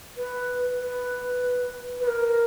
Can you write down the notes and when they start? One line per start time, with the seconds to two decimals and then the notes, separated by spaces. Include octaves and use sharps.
0.17 B4
0.81 B4
2.00 B4
2.07 A#4